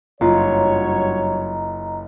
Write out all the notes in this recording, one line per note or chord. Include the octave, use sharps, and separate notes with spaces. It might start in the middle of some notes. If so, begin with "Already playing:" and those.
F#1 G2 F#3 F4 C#5 D#5 A#5